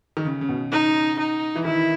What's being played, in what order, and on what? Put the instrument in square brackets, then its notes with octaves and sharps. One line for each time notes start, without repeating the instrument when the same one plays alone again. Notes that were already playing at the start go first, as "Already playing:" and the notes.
[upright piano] D#3
C#3
C#3
B2
[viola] D#4
D#4
[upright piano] E3
[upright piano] D#3 [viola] E4